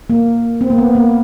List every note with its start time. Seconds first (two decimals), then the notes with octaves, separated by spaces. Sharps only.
0.10 A#3
0.61 C4
0.70 A#3
0.78 B3
0.95 A#3